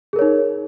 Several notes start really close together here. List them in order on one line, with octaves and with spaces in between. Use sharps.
G#4 A#4 C#5 D#4